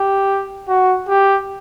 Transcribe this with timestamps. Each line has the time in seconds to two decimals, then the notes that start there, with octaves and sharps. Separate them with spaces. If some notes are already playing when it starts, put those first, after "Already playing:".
Already playing: G4
0.68 F#4
1.08 G4